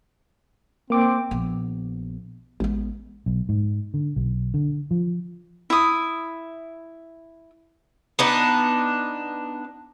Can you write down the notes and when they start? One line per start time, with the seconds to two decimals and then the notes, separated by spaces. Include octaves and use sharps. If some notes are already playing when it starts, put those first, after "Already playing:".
0.90 A#3 C4 D6
1.31 A#1 B3
2.60 A1 G#3 B3
3.26 B1
3.49 G#2
3.94 D3
4.16 B1
4.54 D3
4.91 F3
5.70 E4 D#6
8.19 B3 D4 D#4